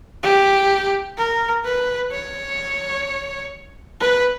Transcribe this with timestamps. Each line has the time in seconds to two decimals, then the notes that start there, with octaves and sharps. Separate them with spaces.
0.23 G4
1.18 A#4
1.65 B4
2.12 C#5
4.01 B4